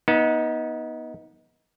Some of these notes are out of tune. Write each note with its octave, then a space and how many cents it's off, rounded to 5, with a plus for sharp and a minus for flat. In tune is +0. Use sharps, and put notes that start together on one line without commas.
B3 -25 D#4 +20